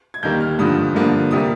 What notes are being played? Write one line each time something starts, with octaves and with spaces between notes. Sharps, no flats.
G#6
D#2 D#3 G3 A#3 G6
F6
G2 D3 F3 D#6
G2 D3 F3 A#3
C3 G3 A#3 D#6